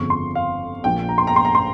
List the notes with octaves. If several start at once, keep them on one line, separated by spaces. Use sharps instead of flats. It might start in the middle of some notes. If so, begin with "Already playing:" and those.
Already playing: G1 F2 C#3 F3 C#6
C6
F5
A#1 A#2 F3 G5
A#5
C6
A#5
C6
A#5
C6